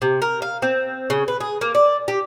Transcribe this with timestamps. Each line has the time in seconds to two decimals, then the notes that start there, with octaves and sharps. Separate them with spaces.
0.02 C3
0.22 A#4
0.42 F5
0.62 C4
1.10 C#3
1.28 B4
1.40 G#4
1.61 A#3
1.75 D5
2.08 G4